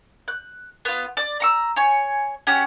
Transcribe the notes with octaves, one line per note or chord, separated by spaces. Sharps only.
F#6
B3 F4
D5
A#5 C#6 E6
C#5 G#5
C#4 F#4 G4